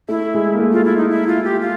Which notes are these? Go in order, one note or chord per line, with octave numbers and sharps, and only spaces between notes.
A3 E4
G#3
A#3
A3
F4
E4
D#4
E4
F4
G4
F4